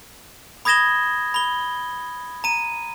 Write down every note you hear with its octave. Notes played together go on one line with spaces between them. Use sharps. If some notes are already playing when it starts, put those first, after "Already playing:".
B5 D#6 G#6 A#6 E7 G7
B5 G7
A#5 D#7